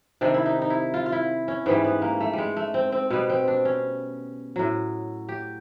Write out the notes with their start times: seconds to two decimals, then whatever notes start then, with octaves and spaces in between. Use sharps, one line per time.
0.21 C3 D#3 G3 D4
0.34 E4
0.46 D#4
0.62 D#4
0.70 E4
0.94 F4
1.06 F4
1.12 E4
1.48 C#4
1.66 G#2 E3 G3 B3
1.85 B3
2.02 A#3
2.20 A3
2.33 G3 G#3
2.57 A3
2.74 C4
2.92 C4
3.10 B2 G3 B3
3.30 C4
3.48 D4
3.65 C#4
4.56 A2 F#3
5.29 G4